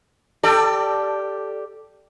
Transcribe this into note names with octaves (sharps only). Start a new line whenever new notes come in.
G4 A4 D5